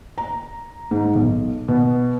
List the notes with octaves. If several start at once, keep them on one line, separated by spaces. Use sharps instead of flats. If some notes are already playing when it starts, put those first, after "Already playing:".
A#5
G#2
B1
B2